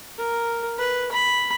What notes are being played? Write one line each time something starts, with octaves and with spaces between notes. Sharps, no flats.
A#4
B4
B5